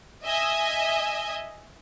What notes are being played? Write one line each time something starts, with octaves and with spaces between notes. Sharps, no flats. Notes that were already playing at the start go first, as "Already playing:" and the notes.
D#5 E5 G#5